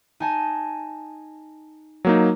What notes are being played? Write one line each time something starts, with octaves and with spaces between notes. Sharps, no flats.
D#4 G#5 A5
F#3 A#3 D#4